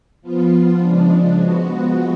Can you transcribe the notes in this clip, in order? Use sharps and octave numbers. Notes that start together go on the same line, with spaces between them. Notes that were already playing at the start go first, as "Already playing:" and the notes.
F3 B3 F4
C#3 F3 G#3 D4
F3 G#3 B3 F#4